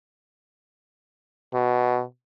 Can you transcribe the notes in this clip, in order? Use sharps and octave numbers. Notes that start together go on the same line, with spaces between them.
B2